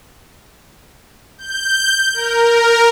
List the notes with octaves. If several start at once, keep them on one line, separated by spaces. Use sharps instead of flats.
G6
A#4